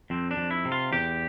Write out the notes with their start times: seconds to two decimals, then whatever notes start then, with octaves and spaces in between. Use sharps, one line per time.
0.10 F2 C4
0.31 D4
0.37 F2
0.51 E4
0.65 C3
0.72 F4
0.92 E2 G4